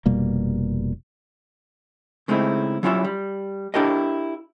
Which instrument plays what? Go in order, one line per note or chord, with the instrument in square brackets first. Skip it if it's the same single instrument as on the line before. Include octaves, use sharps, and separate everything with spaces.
[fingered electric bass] F1 B2 G3 A#3
[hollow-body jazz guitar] C#3 G#3 A3 C4 D#4 E4
F#3 G3 C#4 E4 F4 E5
G3
D4 E4 G4 A4 A#4 D#5